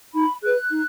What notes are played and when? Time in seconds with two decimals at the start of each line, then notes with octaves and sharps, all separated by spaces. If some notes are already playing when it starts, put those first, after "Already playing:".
0.14 D#4 B5
0.42 G#4 B4 F#6
0.70 D#4